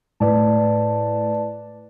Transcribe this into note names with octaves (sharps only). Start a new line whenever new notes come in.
A2 B4 D5 A5